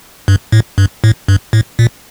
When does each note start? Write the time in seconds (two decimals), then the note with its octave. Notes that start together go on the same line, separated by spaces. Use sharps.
0.28 G2
0.52 A2
0.78 G2
1.04 A2
1.28 G2
1.53 A2
1.79 A#2